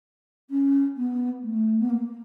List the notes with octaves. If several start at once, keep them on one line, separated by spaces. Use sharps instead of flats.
C#4
B3
A3
B3
A#3